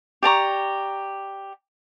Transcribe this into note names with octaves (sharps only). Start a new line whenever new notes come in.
G4 D5 A#5 C#6